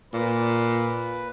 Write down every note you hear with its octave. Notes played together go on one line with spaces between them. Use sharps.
A#2 B4